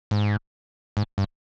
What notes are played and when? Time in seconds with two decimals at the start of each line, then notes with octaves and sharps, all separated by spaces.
0.11 G#2
0.97 G#2
1.18 G2